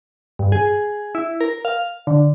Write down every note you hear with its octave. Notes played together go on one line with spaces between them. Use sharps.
G2
G#4
E4
A#4
F5
D3